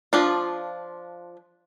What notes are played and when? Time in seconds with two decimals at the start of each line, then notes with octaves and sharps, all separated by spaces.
0.13 F3 D4 F4